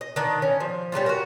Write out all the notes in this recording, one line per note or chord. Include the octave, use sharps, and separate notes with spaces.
D#5
D#3 D4
C#4
F3
G3 A3 C#4 F4
F#4 A#4